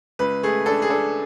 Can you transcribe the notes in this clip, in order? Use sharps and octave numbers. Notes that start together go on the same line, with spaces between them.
C#2 B4
A3 G#4
D4 A4
G#4
D4 A4